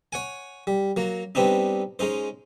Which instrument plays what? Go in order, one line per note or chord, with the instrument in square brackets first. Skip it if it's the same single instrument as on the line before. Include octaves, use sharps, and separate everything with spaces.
[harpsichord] C#5 F#5 G#5
G3
F#3 A#3
G3 B3 C4 D4 D#4
G#3 C#4 D#4 C5